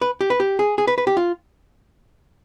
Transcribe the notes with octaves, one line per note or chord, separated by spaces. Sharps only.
B4
G4
B4
G4
G#4
G#4
B4
B4
G4
F4